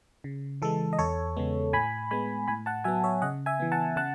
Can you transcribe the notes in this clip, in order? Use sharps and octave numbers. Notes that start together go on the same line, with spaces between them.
C#3
E3 G#3 A4
D#5
E2 A4 C#5
C#3 G#3 B3
A2 G#5 B5
G#3 B3 G#5 B5
A2 G#5 B5
F#5 A5
F#3 B3 E5 G#5
C#5 E5
C#3 D#5 F#5
E5 G#5
E3 B3
F#5 A5
C#3 F#5 A5